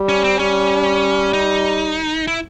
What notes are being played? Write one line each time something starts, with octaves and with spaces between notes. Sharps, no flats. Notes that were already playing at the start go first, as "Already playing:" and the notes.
Already playing: G3
C#4
C4
G3 C#4
D#4
E4